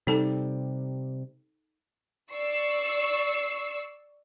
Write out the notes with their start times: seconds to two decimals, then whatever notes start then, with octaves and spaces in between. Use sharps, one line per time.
0.07 C3 G3 D#4 A4 A5
2.33 D5 C#6 E6 C7